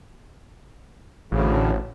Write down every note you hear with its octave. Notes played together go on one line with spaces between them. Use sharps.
A1 D2 A2 C#3